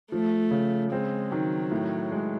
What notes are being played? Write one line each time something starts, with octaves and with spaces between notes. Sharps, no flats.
F3 A3
C#3
G#3 C4
D#3 F#3
A2
G#3